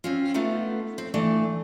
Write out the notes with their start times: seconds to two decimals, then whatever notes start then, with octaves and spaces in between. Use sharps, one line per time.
0.04 C4 C#4 F4
0.34 A3 B3 D#4 F4 A4
0.98 C4
1.14 A#2 E3 A3 D4 D5